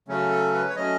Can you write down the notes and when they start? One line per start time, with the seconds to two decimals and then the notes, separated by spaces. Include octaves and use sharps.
0.08 C#3 F#3 A3 C#4
0.30 A4
0.53 B4
0.69 C#5
0.76 F#3 A3 C#4 D#5